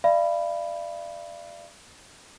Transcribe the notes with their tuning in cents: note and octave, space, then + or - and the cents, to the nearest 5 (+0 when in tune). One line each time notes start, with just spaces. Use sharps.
D5 +20 F5 -40 B5 +0